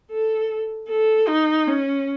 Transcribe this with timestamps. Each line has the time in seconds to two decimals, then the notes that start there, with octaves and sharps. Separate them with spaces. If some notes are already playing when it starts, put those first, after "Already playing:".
0.11 A4
0.89 A4
1.28 D#4
1.67 C#4